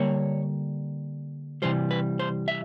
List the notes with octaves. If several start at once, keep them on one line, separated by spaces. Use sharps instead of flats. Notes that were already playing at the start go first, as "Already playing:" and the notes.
Already playing: D3 G3 A#3 C#5
C3 E3 G3 C5
B4
C5
E5